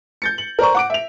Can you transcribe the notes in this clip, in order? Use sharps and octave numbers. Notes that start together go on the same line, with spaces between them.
G6 A6 C#7
F#7
A#4 C5 D5 A#5 C#6
F#5 D6 D7
E5 F7